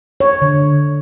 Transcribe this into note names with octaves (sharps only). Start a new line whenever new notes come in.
C#5
D3